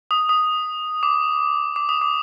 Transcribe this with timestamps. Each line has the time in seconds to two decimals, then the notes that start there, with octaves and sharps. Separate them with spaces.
0.11 D#6
0.29 D#6
1.03 D6
1.76 D6
1.89 D#6
2.02 D6